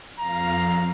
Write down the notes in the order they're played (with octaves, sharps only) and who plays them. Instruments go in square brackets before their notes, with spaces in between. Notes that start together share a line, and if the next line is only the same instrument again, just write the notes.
[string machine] F2 F5 [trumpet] A#5